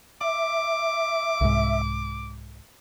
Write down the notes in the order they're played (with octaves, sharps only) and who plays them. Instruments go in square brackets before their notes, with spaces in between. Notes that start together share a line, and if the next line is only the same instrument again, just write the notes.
[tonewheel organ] E5 [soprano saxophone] D6
[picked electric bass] C2 G#2